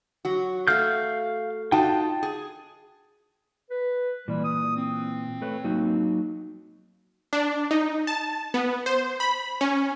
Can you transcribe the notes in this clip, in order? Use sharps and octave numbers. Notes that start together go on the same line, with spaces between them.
F#3 F#4
A3 F#4 F5 F6 G6
D#4 F4 F#4 G5 A5
G#4
B4
A#2 E3 G3
D#6
C4
A3 B4 C#5
F#3 A#3 D#4
D4
D#4
A5
B3
C5
B5
C#4